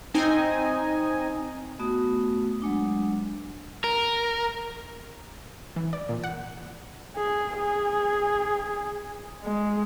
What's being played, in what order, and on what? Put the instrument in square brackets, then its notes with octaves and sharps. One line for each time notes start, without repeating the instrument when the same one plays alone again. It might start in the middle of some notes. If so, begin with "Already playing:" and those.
[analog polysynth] C4 D#4 D#5 G#5
[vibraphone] A3 B3 F#4 D#6
F#3 G#3 D4
[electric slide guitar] A#4
[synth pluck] E3
D5
A#2
F#5
[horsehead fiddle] G#4
G#4
G#3